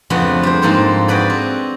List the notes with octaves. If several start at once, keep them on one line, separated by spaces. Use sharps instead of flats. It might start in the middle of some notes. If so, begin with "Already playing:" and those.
F2 C#3 A3 B3 D4
G3 C5
F2 G#2 A#3 A4 C5 C6
F#4 G#4 B4 D5 G5
C4